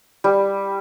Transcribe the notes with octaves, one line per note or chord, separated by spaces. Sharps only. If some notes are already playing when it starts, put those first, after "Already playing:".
G3